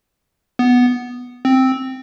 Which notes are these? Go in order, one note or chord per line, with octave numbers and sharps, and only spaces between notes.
B3
C4